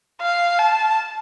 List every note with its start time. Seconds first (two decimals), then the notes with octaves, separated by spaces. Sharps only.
0.21 F5
0.58 A5